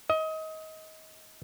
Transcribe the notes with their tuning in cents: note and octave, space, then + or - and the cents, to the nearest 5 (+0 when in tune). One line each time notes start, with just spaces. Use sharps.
D#5 +25